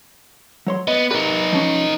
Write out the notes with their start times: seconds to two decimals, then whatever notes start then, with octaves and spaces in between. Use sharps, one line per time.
0.67 F#3 C#5 C6
0.88 B3 D#5
1.11 D#4 G4 A#4 B4 D5
1.53 F3 C#4